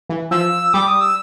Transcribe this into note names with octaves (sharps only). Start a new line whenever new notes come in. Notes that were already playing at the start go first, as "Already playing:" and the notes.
E3
F3 E6
G3 D6
D#6
E6